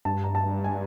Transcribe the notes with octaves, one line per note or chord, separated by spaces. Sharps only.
G2 A5
A#5
A5
G#5